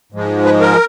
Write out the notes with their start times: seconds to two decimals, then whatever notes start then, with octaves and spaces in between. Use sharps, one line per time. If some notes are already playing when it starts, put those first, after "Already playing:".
0.12 G#2 F3 G#3
0.45 B4
0.61 A#4